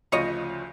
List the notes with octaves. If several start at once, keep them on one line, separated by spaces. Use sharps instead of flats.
D2 C#3 F3 C#5 D#5